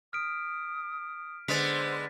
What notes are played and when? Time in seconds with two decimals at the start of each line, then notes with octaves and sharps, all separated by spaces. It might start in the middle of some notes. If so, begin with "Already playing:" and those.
0.13 D#6 F6 B6 D7
1.48 D3 G#3 B3 C5 A6 B6